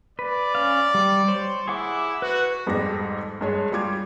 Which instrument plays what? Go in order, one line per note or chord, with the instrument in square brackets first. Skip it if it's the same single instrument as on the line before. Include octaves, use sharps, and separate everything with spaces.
[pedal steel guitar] B4 [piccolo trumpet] D5
[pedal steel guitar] C#4 F5
G3
C5 C#5
[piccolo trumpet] E4 [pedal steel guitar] G#4 F#5 D6
[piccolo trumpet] F#4 [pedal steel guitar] B4
[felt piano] F2 G#2 G3 D6 A#6
G2 G#3 C#5
G3 F4 D6 G#6